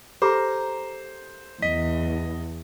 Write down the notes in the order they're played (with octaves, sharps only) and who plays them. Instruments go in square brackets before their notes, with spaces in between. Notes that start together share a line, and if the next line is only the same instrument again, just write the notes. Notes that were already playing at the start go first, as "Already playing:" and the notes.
[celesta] G4 A4 D6 [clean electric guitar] A#4 [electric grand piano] C5
[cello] E2 [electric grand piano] D#5 [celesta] B6